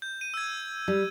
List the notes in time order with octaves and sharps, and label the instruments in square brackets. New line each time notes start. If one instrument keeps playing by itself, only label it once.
[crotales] G6
D#7
E6 G#6
[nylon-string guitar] G3